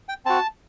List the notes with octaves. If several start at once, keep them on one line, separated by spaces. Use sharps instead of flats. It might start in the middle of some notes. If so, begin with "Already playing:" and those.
G5
C4 F#4 A5